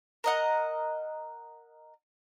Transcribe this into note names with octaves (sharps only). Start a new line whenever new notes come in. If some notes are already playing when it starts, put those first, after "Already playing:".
A#4 D#5 F#5